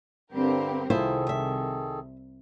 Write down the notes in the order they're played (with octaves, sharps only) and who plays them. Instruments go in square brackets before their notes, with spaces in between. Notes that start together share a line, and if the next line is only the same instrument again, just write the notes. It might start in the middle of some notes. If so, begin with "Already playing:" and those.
[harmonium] G2 D3 G3 [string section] C4 G4 A#4
[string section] C2 [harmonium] D#3 G#4 A4 [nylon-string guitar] E4 F4 C5
[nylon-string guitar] E5